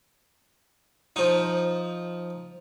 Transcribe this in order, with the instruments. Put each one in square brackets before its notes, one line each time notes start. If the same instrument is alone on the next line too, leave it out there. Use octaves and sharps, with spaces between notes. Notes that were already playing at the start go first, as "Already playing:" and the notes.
[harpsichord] F3 D#4